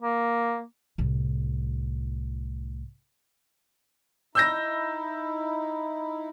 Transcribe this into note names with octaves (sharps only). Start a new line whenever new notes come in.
A#3
C2 A2
D#4 E4 E6 G6 A#6